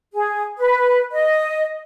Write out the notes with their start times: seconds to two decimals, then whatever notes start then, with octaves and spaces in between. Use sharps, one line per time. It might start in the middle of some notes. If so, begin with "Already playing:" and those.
0.13 G#4
0.58 B4
1.12 D#5